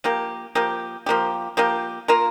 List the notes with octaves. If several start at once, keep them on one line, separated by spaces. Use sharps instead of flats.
F3 A#3 G4
F3 A#3 G4
F3 A#3 G4
F3 A#3 G4
A#3 F4 A#4